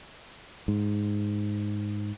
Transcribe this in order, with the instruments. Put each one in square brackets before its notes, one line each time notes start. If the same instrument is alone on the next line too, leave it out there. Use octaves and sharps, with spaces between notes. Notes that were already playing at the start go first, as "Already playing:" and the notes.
[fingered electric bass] G#2